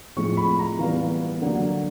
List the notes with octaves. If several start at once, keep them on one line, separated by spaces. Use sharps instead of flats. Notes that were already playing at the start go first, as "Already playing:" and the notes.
A2 F3 G#3 C4 C#6
B5
A#5
E3 G3 B3 F5
D3 F#3 A#3